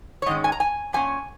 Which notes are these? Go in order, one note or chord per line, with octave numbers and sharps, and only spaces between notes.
C#5
G#2 D#3 G#3 C#4 D#5
G#5
A#5
G#5
A#2 G3 C#4 G#5